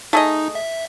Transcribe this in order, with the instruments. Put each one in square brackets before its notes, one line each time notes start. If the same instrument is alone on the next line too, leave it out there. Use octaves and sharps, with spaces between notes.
[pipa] A3 G#4 D#5 [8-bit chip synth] D#4
[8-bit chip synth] E5